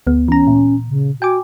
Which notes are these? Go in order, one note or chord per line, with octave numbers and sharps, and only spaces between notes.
D2 B3
E3 C#4 A#5
A#2
C#3
F#4 G5 G#5 D6